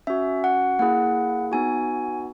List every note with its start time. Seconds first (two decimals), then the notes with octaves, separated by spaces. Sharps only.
0.07 C#4 F#4 E5
0.44 F#5
0.79 A#3 E4 G#4 F#5
1.52 B3 D#4 F#4 G#5